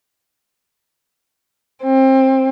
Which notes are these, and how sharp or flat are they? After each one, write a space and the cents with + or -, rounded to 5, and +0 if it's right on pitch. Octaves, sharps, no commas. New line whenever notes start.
C4 +25